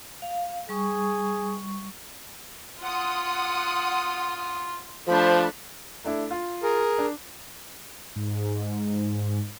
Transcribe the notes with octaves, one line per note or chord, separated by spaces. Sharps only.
F5
G3 G#4 C#6
F4 F#5 C6 D#6
F3 A3 D4 C5 A5 B5
A3 D4 E4
F4
G#4 A#4
D4
G#2